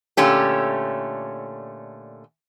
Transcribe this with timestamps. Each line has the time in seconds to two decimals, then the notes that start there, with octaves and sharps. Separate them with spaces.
0.17 A#2 D3 A3 C#4 G4